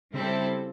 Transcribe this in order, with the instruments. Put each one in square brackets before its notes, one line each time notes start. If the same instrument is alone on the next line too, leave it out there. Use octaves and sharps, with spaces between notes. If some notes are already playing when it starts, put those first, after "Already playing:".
[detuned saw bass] C#3 [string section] G3 C4 E4 A4